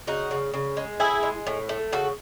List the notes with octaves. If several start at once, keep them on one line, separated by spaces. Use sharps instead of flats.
C#3 D#4 F#4
C#3
C#3
G#3
A2 E4 G#4
G#3
A2
A3
C#3 F#4 A4